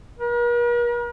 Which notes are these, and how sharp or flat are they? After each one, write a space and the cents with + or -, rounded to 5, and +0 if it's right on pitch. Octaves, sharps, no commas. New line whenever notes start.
A#4 +45